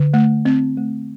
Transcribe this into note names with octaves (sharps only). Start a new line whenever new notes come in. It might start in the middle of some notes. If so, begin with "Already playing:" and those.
Already playing: D3
A3
C4
A3